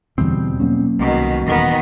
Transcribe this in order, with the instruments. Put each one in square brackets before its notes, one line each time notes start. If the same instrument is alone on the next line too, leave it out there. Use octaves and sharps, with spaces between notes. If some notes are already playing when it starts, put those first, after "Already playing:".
[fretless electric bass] E2 D3 E3 [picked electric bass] B2 G3 C4
[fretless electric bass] F#3 A#3 C#4
[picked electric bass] C2 [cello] B2 D#3
[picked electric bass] D#1 E2 [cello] D#3 B3